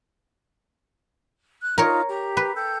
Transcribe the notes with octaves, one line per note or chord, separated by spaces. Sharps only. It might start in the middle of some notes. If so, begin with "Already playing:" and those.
F#6
D#4 F4 A#4 C#5
G4 A#5
B4
A4 G5 G6